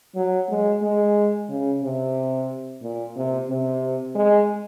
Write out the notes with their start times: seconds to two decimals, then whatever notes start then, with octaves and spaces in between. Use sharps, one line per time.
0.16 F#3
0.49 G#3
0.82 G#3
1.49 C#3
1.83 C3
2.82 A#2
3.16 C3
3.49 C3
4.15 G#3